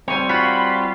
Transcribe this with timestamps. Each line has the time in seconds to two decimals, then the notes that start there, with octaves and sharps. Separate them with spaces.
0.08 G3 C4 C#5 G#5
0.29 F4 F#4 B5